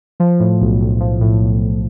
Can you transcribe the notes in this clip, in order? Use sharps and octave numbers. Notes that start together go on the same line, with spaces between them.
F3
A2
B1
B1
F3
A2
B1
B1